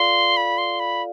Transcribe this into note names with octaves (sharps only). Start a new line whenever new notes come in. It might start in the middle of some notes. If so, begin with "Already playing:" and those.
Already playing: F4 A4 D5 F5 C6
B5
C6
B5